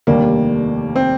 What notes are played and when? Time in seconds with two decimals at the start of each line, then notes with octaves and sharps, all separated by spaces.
0.07 F1 D#2 D#3 G3 A#3 D4
0.96 C4